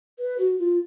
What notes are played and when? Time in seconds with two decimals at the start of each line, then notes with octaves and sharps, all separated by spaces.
0.18 B4
0.38 F#4
0.58 F4